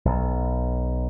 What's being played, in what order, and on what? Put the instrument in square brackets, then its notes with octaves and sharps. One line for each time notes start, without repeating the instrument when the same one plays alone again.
[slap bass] B1